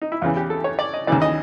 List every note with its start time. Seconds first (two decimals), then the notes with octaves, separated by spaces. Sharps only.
0.02 D#4
0.12 E4
0.21 E2 C#3 E3 F4
0.37 G4
0.50 A4
0.64 C#5
0.79 D5
0.94 D#5
1.07 D#2 C#3 E3 D5
1.22 D#5